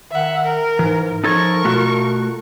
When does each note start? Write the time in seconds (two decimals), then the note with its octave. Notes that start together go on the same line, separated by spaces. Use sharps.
0.11 D#3 E5 F#5
0.45 A#4
0.79 G#2 E3
1.24 F3 D#4 A4 A#4 C#5 C#6
1.65 B2 A3 F4 F#4